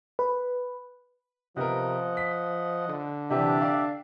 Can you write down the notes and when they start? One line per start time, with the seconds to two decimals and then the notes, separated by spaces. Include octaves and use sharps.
0.19 B4
1.56 C3 F3 B3 A#4 D#5 F#5
2.17 B6
2.89 D3
3.30 C3 E3 D4 G4 E5
3.61 D5 F5 D6